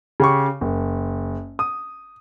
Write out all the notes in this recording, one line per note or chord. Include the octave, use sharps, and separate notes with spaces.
C#3 G4 C#6
F#1
D#6